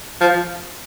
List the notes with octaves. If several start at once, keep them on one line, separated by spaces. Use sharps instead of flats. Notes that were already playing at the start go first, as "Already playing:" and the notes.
F3